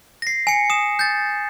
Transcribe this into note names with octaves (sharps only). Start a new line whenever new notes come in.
A#6 C7
G#5 C#7
D#6 E7
G6 A6